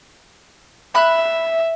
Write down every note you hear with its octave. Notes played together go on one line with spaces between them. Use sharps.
E5 B5 F#6